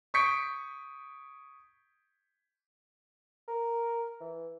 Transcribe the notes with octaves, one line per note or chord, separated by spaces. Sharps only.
C#6 D#6 G6 B6 C#7 D7
A#4
E3